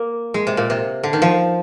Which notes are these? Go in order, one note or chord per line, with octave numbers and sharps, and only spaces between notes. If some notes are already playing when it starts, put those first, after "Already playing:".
Already playing: A#3
G#3
C3
A#2
C3
D3
D#3
F3